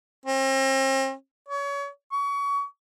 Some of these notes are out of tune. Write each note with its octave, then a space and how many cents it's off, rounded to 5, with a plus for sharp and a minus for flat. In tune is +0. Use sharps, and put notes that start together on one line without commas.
C4 +40
C#5 +30
C#6 +30